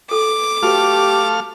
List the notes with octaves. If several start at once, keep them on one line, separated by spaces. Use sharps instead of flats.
A4 D6
A3 F#4 G4 B4 F5 F6